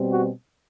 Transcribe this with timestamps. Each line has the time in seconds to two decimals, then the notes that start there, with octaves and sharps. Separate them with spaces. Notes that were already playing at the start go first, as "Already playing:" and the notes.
Already playing: B2 G3 C4
0.12 F#4